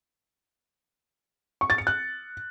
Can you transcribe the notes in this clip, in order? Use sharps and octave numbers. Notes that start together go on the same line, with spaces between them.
C#6
A6
C#7
F#6